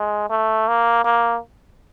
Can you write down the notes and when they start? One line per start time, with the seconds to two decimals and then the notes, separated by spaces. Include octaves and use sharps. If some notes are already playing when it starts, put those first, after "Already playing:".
Already playing: G#3
0.30 A3
0.68 A#3
1.04 A#3